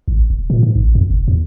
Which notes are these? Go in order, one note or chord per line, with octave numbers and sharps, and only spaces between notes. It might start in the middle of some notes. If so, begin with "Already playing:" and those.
A1
E1
A#2
G#2
A1
F2
F1
E2